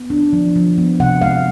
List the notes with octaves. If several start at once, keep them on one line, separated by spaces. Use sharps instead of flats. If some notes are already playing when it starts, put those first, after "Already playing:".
Already playing: B3
D4
F3
F3
B3
C3 F#5
G#3 F5